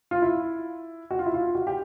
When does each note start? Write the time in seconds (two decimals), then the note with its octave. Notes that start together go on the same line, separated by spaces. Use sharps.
0.11 F4
0.22 E4
1.11 F#4
1.19 F4
1.26 E4
1.34 F4
1.55 F#4
1.67 G4